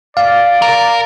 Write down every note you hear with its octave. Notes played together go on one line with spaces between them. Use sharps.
D5 F5
A#4